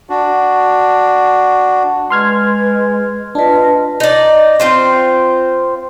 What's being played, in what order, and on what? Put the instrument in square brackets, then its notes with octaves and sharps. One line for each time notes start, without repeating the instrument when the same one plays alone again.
[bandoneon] D4 F#4
[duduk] G#3 [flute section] B4 [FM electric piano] C6 F6 G#6
[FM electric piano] D4 [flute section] F4 D#5 [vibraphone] B4 A5
[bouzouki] D#4 D5
C4 F4 C5